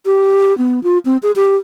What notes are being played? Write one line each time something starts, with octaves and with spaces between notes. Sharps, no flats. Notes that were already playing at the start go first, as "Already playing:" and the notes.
G4
B3
F4
C4
G#4
G4